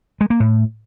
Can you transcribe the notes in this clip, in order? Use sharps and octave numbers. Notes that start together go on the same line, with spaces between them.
G#3
A#3
A2